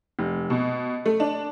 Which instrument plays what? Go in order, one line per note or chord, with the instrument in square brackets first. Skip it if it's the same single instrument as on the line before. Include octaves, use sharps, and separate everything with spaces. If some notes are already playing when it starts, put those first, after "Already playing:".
[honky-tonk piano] F1
B2
A3
D4